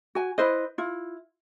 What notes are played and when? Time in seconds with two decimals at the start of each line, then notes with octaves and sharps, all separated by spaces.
0.15 F#4 G#5
0.38 E4 B4 C5 D#5
0.78 E4 F4